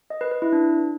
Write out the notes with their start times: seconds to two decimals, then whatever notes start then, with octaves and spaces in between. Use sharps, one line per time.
0.10 D#5
0.21 B4
0.31 B4
0.42 E4
0.52 D4